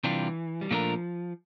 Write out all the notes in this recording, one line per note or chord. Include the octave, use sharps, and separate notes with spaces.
C3 E3 G3 D4 F4
G3
A#2 F3 A3 D4 F4 A#4